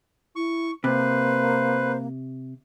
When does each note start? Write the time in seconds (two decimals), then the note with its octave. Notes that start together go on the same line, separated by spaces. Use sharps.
0.36 E4 C#6
0.84 C3 A#3 B4 C5